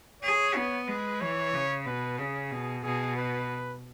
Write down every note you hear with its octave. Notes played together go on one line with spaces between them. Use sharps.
G#4 C#5
B3
G#3 B4
E3 C#5
C#3
B2 B4
C#3 G#4
B2
B2 G#4
B4